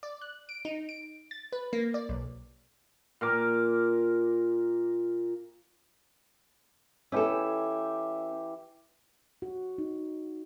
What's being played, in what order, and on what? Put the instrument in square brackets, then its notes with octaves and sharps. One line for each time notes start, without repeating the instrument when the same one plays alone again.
[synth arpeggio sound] D5
F#6
D7
D#4
D7
A6
B4
A#3
D5
B1
[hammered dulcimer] A#2 A#4 D6
[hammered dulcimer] E3 G4 E5 [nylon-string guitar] C#4 A4
[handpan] F#4
D#4